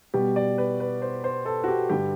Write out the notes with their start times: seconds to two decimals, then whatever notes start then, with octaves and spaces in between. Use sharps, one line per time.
0.14 B2 G3 G4
0.36 D5
0.58 B4
0.80 B4
1.02 C5
1.24 C5
1.46 A4
1.64 F#4
1.68 G4
1.89 G2 D3 G3 G4